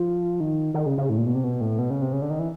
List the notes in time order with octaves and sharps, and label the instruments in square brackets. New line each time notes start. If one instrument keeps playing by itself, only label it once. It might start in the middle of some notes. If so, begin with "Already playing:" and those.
Already playing: [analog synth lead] F3
D#3
D#3
C#3
C#3
A2
A#2
B2
C3
B2
A2
B2
C#3
C3
C#3
D3
D#3
E3